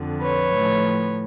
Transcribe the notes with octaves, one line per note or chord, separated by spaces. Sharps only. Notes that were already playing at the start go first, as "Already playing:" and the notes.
Already playing: F2 D3 F3
B4 C#5
A2 F3